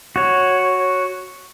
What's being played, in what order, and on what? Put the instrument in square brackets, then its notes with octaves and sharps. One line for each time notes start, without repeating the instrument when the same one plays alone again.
[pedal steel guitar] F#4 C#5